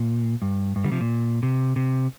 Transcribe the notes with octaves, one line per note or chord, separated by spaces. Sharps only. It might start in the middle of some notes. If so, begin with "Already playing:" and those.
Already playing: A#2
G2
G2
D3 G3
C3 F3
A#2
C3
C3